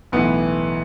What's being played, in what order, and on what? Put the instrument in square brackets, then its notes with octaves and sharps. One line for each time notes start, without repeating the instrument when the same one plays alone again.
[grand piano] B1 A2 E3 B3